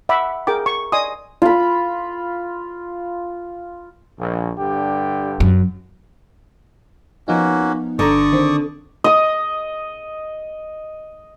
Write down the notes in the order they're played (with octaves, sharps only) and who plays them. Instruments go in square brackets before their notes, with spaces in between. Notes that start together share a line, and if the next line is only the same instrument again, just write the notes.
[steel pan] E5 F#5 B5 D6
G#4 A#4 G5 D6
C#6
D5 D#5 G#5 C6 D#6
[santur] F4 B5
[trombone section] A#1
G2 D3 G4
[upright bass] F#2
[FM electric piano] F3 B3 D#4 [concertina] A#3 C#4 F#4
[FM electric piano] G1 A#5 [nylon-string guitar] D3 [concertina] D5 C#6 D#6
[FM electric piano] D#3 C4
[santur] D#5 D#6